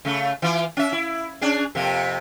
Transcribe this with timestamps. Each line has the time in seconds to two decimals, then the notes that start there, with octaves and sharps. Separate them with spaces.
0.05 C#3 A3
0.42 E3 F4
0.77 C#4 E5
0.92 E4
1.41 C#4 D4 G#4
1.75 F2 C3 A#3